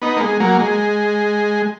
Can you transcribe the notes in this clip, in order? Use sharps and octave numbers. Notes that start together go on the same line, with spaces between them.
B3 D#4
A#3
G#3
F#3 A#3
G#3